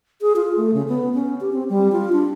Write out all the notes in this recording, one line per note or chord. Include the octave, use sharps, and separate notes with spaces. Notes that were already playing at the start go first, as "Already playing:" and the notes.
G#4
F4
A3
C#3
B3
C#4
G4
C4
G3
F4
D4